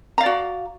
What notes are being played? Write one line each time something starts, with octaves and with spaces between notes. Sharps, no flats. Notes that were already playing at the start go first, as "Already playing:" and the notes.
F#4 D5 F5 A#5